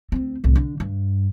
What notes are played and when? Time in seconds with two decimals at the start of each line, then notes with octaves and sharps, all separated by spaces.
0.12 D2 C4
0.44 C2 A2
0.56 D3
0.80 G2